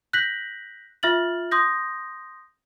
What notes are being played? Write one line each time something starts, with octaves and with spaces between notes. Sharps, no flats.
F#6 G6 A#6 B6 F#7
F4 E5 F6 A6 F#7
C6 D#6 G6 A#6